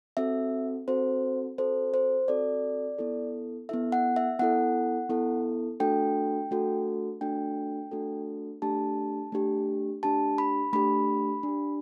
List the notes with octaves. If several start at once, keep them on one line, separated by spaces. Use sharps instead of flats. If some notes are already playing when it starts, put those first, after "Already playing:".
C4 F#4 A4 E5
C4 F#4 A4 C5
C4 F#4 A4 C5
C5
C4 F#4 A4 D5
B3 E4 A4
B3 E4 A4 E5
F#5
E5
B3 E4 A4 F#5
B3 E4 A4
A3 D4 F#4 A4 G5
A3 D4 F#4 A4
A3 D4 F#4 A4 G5
A3 D4 F#4 A4
A3 D4 G4 A5
A3 D4 G4
A3 D4 G4 A5
B5
A3 D4 G4 B5
D4
G4